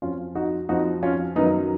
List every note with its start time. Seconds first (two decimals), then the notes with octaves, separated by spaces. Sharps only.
0.02 F2 F3 C#4 F4
0.35 D#4 F#4
0.69 F2 F3 D#4 F#4
1.03 C#4 F4
1.36 F#2 D#3 F#3 B3 D#4